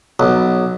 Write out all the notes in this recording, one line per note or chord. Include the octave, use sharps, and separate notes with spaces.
B1